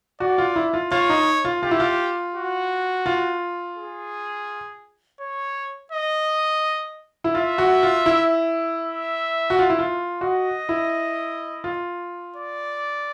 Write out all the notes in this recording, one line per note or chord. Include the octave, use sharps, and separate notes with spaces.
F#4 D5
F4
E4
F4
F4 C#5
D#4
F4
F4 G4
E4
F4
F#4
F4
G#4
C#5
D#5
E4
F4 E5
F#4
F4
E4
E5
F#4
F4
E4
F4
F#4 D#5
E4
F4
D5